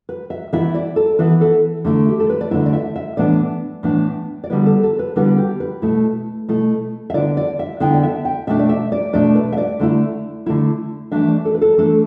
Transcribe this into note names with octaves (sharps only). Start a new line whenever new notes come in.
B4
E5
E3 B3 E4 E5
D5
A4
E3 B3 E4 B4
A4
D3 A3 E4
G4
A4
B4
D5
D3 A3 E4 E5
D5
E5
E5
A2 E3 B3 D4 D5
A2 E3 B3 D4
D5
D3 G3 B3 E4 B4
A4
A4
B4
D3 G3 B3 E4 B4
G4
B4
B2 A3 E4
B2 A3 E4
E5
D3 B3 E4 D5
D5
E5
D3 B3 E4 G5
D5
E5
G5
B2 A3 D4 E5
D5
E5
D5
B2 A3 D4 D5
B4
E5
D5
D3 A3 E4
D3 A3 E4
E3 A3 D4 E5
D5
A4
B4
A4
E3 A3 D4 A4